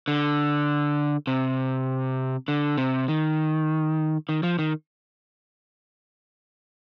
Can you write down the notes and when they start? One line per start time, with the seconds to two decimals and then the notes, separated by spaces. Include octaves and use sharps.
0.08 D3
1.27 C3
2.48 D3
2.78 C3
3.08 D#3
4.29 D#3
4.43 F3
4.59 D#3